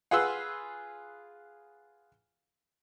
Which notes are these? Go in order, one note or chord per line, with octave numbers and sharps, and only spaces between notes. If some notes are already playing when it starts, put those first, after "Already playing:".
F4 G#4 B4 F#5 C6 E6